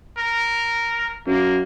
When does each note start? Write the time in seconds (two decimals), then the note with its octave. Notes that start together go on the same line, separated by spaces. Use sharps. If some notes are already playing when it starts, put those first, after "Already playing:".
0.18 A#4
1.27 F#2 A#3